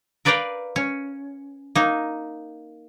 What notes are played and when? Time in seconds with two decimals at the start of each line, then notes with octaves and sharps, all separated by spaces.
0.25 A#4 B4 D5 F5 G5 A#5
0.76 C#4
1.75 A#3 D#4